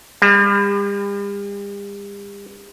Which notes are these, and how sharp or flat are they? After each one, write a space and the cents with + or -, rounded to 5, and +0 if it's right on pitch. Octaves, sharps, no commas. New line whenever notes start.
G3 +40